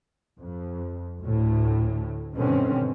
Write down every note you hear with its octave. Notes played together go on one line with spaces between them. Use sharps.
F2
D2 A2
G2 B2 D3 D#3 C4 C#4